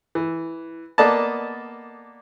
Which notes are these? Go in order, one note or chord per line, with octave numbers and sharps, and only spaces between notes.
E3
A#3 B3 D5 D#5 A5